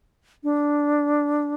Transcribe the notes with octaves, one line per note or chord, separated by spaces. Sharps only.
D4